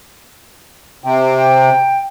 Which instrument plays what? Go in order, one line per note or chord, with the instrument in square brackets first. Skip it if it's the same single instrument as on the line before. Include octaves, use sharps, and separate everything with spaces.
[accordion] C3 [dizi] G5